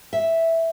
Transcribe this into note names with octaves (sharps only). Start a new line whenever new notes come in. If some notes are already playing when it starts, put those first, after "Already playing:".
E5